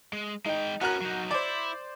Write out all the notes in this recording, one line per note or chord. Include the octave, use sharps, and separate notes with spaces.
G#3
G#3 D#4 G5
B3 C#4 F#4 A#4 F#6
F#3 D#4
E4 C5 D5